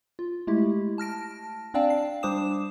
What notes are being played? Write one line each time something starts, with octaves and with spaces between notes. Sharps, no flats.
F4
G#3 A3 E4 G4
A5 F6 A#6 D7
C4 D4 D5 F5 G5 A5
C7
G3 D4 C5 D6 D#6 E7